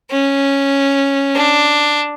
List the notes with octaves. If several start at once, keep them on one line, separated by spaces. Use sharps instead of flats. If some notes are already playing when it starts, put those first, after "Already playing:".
C#4
D4